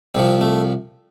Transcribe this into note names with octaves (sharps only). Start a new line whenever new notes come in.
C2 C3 F3 C4
A3